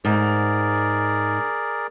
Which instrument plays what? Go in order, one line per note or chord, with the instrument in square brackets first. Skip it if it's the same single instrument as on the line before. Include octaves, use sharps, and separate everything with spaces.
[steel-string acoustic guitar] G#2 [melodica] G#4 A#4 D5